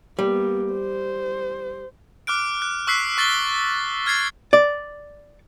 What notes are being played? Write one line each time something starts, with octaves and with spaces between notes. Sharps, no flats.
G3 A#3 B3
C5
D6 F6 F#6 D7
F#6
C#6 E6 F#6 B6 C7
C#6 A6 C7 G7
F6 G#6 A6 C7
D5